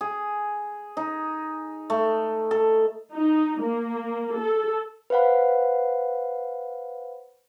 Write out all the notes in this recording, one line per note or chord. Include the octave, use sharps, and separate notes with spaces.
G#4
D#4
A3
A4
D#4
A#3
A4
B4 C5 F5 F#5 B5